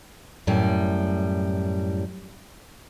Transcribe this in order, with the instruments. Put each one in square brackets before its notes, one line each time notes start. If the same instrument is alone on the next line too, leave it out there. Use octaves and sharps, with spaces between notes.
[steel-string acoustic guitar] F#2 A2 G3